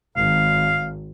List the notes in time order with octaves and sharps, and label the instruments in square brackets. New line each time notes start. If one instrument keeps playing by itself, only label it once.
[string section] G#1 [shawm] F5